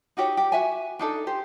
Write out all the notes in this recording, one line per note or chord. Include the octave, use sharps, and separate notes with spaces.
D#4 F#4 G4 C#5
G4
F#4 E5 G#5
D4 D#4 A4
G4 C5